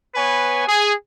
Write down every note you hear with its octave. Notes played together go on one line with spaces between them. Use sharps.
B3 B4 C#5 G#5
G#4